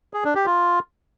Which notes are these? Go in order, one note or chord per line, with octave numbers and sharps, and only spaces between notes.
G#4
D4
G4
F4